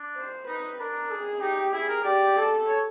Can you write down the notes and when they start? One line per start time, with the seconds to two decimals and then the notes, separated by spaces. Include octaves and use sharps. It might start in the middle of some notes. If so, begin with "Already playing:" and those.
Already playing: D4
0.16 C5
0.47 D#4 B4
0.79 D4 A#4
1.11 G#4
1.42 D#4 G4
1.73 E4 G#4
1.89 A#4
2.05 G4 D5
2.37 A4
2.68 C#5